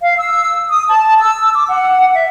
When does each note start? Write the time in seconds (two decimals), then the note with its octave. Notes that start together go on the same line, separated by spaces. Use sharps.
0.01 F5
0.17 E6
0.69 D#6
0.88 A5
1.19 E6
1.53 D6
1.69 F#5
2.14 E5